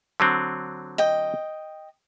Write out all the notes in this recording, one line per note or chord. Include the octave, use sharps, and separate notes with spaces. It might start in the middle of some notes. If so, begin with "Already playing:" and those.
D3 F#3 C4
D#5 G5